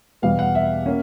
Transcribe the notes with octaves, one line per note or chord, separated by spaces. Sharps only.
E2 B2 G3 B3 F5
F#5
E5
A#3 C#4